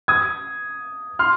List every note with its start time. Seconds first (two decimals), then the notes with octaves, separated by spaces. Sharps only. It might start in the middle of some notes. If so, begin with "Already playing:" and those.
0.08 D#6 G#6
1.19 C6 F6